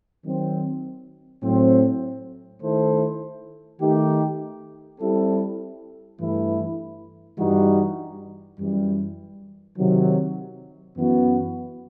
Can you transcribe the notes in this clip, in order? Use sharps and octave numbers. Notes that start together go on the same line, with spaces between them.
D#3 F#3 C4
A2 F#3 C4
D#3 A3 E4 A4 C5
D#3 A3 D#4 G4
G3 C4 E4 A4
G2 E3 A3 E4
G2 E3 G3 D#4 F#4
F#2 E3 G3
C3 D#3 F#3
F#2 E3 B3 F#4